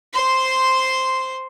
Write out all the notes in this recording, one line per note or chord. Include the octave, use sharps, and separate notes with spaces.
C5 C6